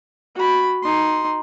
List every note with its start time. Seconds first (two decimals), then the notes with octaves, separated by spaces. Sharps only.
0.36 F#4 B5
0.83 D#4 C6